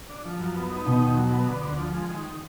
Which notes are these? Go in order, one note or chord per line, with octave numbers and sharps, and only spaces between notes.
D4
F3
F#2
B3
D#4
B2 D#3
D#2
F#3
B3
D3
D2
F3
G#3
D#3